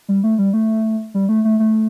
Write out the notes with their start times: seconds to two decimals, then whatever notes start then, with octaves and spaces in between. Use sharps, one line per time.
0.09 G3
0.24 A3
0.38 G3
0.53 A3
1.14 G3
1.29 A3
1.45 A3
1.59 A3